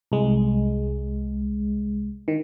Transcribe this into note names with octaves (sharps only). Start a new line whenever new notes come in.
C2 G#3
D#3